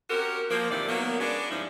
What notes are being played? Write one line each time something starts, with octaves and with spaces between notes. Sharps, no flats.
C4 C#4 F#4 G4 A#4
F3 A#3
A2 C3 D#3 E3 D5
F#3 A#3 B3
G#3 B3 C#4 D4
G2 C3 F3 C#4 D#4 E4